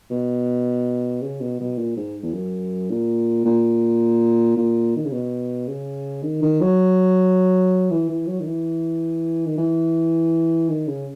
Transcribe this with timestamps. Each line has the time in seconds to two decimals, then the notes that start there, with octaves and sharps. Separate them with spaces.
0.11 B2
1.22 C#3
1.40 B2
1.60 B2
1.78 A#2
1.97 G#2
2.23 E2
2.33 F#2
2.90 A#2
3.45 A#2
4.56 A#2
4.96 D#3
5.05 C#3
5.12 B2
5.68 C#3
6.23 D#3
6.42 D#3
6.60 F#3
7.91 E3
8.09 E3
8.27 F#3
8.40 D#3
8.46 E3
9.46 D#3
9.57 E3
10.69 D#3
10.87 C#3